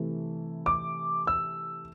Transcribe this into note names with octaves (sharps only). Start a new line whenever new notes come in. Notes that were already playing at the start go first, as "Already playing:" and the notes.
Already playing: C3 E3 A3
D6
E6